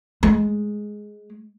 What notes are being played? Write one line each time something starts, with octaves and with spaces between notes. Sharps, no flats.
G#3